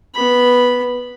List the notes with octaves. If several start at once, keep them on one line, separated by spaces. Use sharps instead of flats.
B3 B5